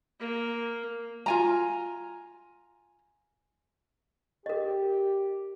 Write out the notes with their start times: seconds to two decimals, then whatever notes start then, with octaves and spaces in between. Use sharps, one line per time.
0.19 A#3
1.26 F4 G#5 A#5
4.46 G4 A#4 D#5